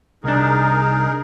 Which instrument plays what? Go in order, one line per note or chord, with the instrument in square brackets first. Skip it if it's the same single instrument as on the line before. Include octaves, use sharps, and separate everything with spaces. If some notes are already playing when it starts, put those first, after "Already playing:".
[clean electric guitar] C2 D4 [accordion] D#4 G#4 A#4